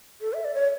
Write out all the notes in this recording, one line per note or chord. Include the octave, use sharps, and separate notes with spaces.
A4
E5
D5
C#5